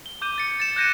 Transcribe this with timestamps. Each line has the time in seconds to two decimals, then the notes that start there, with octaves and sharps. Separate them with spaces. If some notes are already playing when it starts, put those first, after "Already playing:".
0.06 G7
0.21 D6 G6 D#7 G7
0.38 A6 C#7
0.60 A6 E7
0.76 F#6 G6 A#6 C#7 D#7